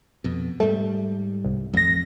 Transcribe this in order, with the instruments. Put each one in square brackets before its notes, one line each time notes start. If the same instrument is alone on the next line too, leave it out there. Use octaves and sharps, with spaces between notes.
[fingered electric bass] F2 B2
[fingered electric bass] G#2 G3 [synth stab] A3
[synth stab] C2
[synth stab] A1 A#6 [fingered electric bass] F2